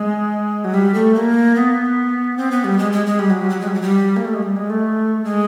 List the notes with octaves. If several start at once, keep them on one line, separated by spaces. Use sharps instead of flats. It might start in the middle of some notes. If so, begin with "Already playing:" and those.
Already playing: G#3
F#3
G3
A3
A#3
B3
C4
B3
G3
G#3
G#3
G#3
G3
F#3
G3
F#3
G#3
G3
F#3
G3
A#3
A3
G#3
G3
G#3
A3
G#3